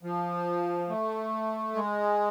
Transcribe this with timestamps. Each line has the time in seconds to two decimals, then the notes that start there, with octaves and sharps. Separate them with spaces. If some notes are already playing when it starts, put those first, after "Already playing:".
0.03 F3
0.89 A3
1.75 G#3